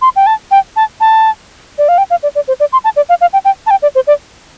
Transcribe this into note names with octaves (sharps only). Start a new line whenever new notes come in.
C6
G5
A5
G5
A5
A5
D5
F5
G5
F5
D5
D5
C5
D5
C6
A5
D5
F5
F5
G5
G5
A5
G5
D5
C5
D5